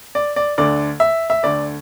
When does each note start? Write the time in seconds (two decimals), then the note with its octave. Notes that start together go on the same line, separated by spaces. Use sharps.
0.15 D5
0.36 D5
0.58 D2 D3 D5
1.00 E5
1.30 E5
1.43 D2 D3 D5